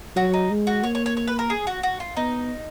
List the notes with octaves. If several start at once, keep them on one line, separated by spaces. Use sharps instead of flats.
F#3 F#4
D#4
G#3
F#4
A#3 C#5
C#5
C#5
C#5
B4
A#4
G#4
F#4
F#4
F4
B3 D#4